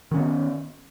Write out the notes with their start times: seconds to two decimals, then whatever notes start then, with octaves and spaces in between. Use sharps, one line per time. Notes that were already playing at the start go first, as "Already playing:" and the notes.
0.11 D#3
0.14 C#4
0.17 B3